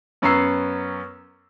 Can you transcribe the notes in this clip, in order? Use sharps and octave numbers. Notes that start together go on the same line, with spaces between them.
F#2 B3 C#4 A#5 E6 C7